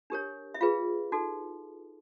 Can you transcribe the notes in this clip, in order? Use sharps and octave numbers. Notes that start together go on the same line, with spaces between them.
D4 G4 A#4 C#5
E5
F4 G#4 B4 F5
D#4 F#4 A4